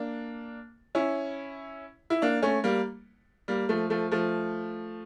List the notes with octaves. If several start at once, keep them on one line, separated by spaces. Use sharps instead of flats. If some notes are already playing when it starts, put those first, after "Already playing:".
Already playing: A#3 D4
C#4 E4
E4
A#3 D4
A3 C#4
G3 A#3
G3 A#3
F3 A3
F3 A3
F3 A3